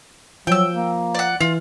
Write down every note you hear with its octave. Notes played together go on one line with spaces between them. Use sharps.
F3 F#3 G5 E6
A#3
D5 F#5
E3 F4